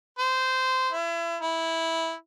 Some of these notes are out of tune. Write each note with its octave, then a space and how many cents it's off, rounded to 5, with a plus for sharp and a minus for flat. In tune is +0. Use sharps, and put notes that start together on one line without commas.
C5 -15
E4 +35
E4 -10